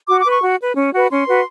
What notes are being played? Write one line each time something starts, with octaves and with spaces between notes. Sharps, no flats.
F#4 D6
D6
B4 C#6
F#4
B4
C#4
F#4 B4
C#4 C6
F#4 B4